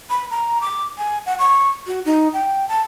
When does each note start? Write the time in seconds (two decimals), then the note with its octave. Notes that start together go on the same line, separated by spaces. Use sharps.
0.10 B5
0.31 A#5
0.61 D6
0.98 G#5
1.26 F#5
1.39 C#6
1.87 F#4
2.05 D#4
2.33 G5
2.68 A5